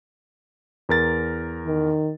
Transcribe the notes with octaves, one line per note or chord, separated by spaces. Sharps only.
E2 A#4 A6
D#3